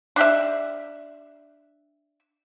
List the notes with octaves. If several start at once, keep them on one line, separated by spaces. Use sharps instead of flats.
D4 G4 E5